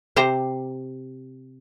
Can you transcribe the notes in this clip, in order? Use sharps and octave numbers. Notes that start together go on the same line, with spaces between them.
C3 G4 C5 A#5